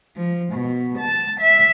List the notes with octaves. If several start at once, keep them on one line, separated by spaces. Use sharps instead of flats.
F3
B2
A5
E5